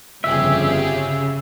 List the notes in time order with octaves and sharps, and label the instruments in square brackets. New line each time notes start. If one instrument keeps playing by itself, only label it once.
[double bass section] G1 F2 [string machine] C#3 [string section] F4 G4 G#4 [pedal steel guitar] E5